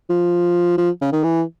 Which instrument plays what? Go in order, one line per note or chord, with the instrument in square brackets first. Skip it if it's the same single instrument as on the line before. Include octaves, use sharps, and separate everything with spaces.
[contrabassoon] F3
F3
C#3
D#3
E3